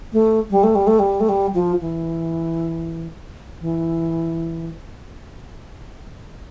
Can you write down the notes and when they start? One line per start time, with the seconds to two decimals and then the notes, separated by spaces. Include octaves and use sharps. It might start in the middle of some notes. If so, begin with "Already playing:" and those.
0.13 A3
0.51 G3
0.63 A3
0.75 G3
0.87 A3
0.99 G3
1.20 A3
1.29 G3
1.54 F3
1.81 E3
3.61 E3